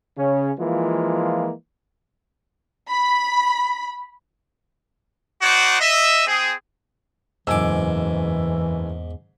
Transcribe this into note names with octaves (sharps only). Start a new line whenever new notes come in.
C#3 C#4
E3 F3 G#3 A#3 F4
B5
D#4 F#4 C5 D5 F#5
D#5 E5
C4 G#4
F#1 E2 G#2 E3 G#5 D6 E6